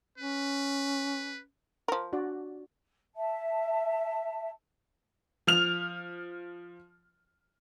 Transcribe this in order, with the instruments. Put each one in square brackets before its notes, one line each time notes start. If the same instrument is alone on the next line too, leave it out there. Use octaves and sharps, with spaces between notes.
[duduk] C#4 [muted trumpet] B4
[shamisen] F3 A#4
[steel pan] D4 F#4 D5
[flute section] E5 A5
[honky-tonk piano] F3 F6 F7